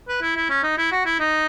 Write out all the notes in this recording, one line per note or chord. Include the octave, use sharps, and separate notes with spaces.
B4
E4
E4
C#4
D#4
E4
F#4
E4
D#4